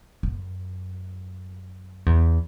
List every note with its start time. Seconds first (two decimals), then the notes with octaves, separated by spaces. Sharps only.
0.23 F#2
2.06 E2